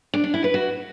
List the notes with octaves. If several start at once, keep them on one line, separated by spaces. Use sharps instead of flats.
D4
D4
E4
B4
F#4